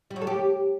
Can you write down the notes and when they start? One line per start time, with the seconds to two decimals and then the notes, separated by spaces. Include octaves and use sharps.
0.10 G3
0.16 F#3
0.21 A4
0.27 G4